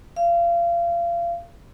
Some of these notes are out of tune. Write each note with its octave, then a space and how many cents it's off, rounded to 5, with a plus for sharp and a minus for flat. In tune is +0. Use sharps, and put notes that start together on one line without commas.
F5 -30